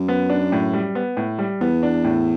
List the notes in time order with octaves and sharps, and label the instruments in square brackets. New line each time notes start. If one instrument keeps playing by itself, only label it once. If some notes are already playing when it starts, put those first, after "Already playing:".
Already playing: [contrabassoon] F#2
[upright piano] B3
D4
A2
G3
B3
A2
G3
[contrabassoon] E2 [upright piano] B3
[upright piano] D4
A2